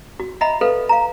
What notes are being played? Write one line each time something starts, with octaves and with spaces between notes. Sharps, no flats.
F#4
D#5 E5 F#5 A#5 B5
A4 B4 F5
F5 A#5